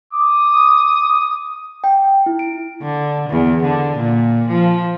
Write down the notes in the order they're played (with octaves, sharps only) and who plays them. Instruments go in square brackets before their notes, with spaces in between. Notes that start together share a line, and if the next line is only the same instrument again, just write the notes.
[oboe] D6 [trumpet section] D#6
[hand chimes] G5
E4
D7
[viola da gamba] D3
E2
D3
A#2
F3